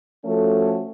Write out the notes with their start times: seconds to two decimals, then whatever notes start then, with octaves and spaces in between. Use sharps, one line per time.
0.25 F3 A3 C#4 F#4 A4